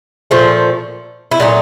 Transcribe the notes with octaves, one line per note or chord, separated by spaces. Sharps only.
A#2 F3 A3
E4
A#2 F#3 A3 D#4